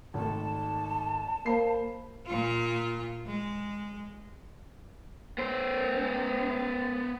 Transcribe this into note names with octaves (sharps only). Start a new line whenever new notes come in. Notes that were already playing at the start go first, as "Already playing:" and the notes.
G#1 D#3 A3 A5
A#3 C5 B5 C7
A#2 F4
G#3
B3 C5